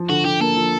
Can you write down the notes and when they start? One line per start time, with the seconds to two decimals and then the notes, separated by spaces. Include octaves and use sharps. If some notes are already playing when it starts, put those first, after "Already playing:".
Already playing: F3
0.09 D3 F#4
0.25 D3 G4
0.40 A#3 A4
0.56 F3